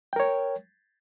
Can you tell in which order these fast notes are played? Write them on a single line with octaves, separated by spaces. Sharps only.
G5 A#4 C#5